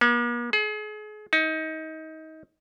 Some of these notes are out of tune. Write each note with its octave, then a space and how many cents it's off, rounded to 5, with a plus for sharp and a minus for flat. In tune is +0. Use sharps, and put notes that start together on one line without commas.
A#3 +45
G#4 +35
D#4 +25